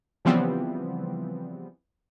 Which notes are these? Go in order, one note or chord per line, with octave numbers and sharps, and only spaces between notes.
C#3 E3 F3 G3 B3 C4